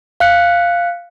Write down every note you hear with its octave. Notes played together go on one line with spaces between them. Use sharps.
F5 F#6 C#7